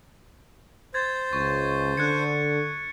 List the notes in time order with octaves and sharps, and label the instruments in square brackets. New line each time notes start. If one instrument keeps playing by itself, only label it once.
[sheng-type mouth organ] C5 [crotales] G#6 A6
[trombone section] C#2 [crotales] C#6
[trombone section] D3 [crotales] F#6 G#6 C#7